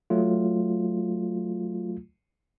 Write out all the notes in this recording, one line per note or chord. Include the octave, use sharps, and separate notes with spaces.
F#3 A3 F4